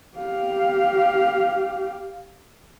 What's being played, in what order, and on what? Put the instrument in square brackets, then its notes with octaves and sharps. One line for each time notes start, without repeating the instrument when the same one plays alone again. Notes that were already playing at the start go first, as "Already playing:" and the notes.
[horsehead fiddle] G4 F5